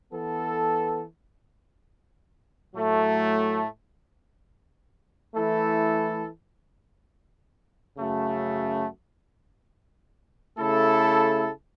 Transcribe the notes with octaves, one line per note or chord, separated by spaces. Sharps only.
E3 B3 A4
A2 F#3 A3
E3 A3 E4 A4
F#2 C#3 A3 F#4
C#3 A3 E4 A4